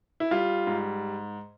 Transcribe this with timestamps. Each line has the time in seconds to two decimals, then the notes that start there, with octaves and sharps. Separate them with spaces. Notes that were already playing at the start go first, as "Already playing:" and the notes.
0.20 E4
0.31 G3 F4
0.67 G#2